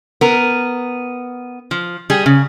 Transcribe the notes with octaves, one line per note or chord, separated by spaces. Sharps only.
B3 A#4
F3
G3 G#4
C#3